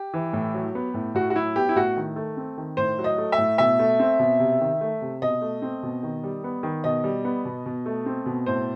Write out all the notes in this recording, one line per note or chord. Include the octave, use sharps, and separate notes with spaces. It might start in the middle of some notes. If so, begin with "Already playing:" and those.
Already playing: G4
E3
A2
F#3
B3
A2
A2 F#4
F#4
F#3 E4
B3 G4
E4
A2 F#4
D#3
A3
C4
D#3
A2 C5
F#3
D#5
A3
E5
A2
B2 E5
A3
C4
B2
C3
D#3
A3
C3
B2 D#5
A3
C4
B2
D#3
G3
B3
D#3
B2 D#5
G3
B3
B2
B2
A3
C4
B2
A2 C5